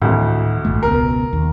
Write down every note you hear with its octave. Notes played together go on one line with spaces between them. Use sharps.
G#1 D2 A2 E3
A1 G2 A3
E1 C#2 B2 A#4
D#2